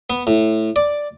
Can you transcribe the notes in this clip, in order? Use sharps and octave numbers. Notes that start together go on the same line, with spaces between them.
B3
A2
D5